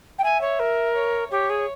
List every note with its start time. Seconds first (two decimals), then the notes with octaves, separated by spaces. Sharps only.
0.18 G5
0.23 E5 G#5
0.41 C#5
0.59 A#4
0.95 C#5
1.31 G4 C#5
1.49 G#4